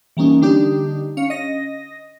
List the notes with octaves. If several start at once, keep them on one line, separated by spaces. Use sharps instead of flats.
E3 G3 A#3 C#4 D#4
D3 G3 D4 D#4 G4
C#4 F5 C#7
D#5 A#6